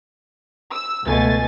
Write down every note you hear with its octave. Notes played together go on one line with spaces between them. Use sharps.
E6
C#2 B2 A3 G#5 A6